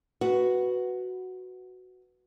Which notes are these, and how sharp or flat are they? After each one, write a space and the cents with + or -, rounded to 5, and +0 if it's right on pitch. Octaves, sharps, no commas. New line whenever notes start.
F#4 +0 B4 +0